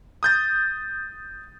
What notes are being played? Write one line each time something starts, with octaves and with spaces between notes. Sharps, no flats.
D#6 G6 A6